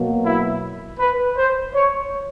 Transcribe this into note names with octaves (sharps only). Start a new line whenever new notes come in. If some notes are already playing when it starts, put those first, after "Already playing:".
Already playing: B2 F#3 A#3
E4
B4
C5
C#5